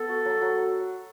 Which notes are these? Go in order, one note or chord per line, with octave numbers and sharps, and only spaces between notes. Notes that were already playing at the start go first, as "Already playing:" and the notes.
Already playing: B3 A4
F#4
F#3
F#3